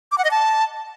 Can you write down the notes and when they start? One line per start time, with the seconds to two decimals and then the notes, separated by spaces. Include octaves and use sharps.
0.12 D6
0.18 F#5
0.24 D#5
0.31 A5